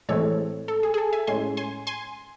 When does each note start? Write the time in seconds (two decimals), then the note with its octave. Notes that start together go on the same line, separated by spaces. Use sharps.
0.09 A2 E3 G#3 C4 A4 C#5
0.68 A4
0.83 G#4
0.94 G#4
0.98 A4
1.13 E5 G#5
1.27 A2 G#3 C#4 G#5 C6
1.57 G#5 C6
1.87 G#5 C6